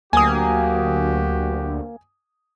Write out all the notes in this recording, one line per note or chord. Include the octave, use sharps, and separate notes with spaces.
D2 F#3 A#3 F#4 G4 G#5 D#6